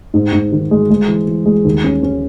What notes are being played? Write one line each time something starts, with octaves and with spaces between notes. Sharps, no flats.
G#2
G#2
D#3
G#3
G#3
E3
E3
G#3
D#2
C#4
C#4